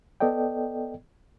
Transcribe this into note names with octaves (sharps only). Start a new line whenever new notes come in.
B3 A4 D5 D#5 G5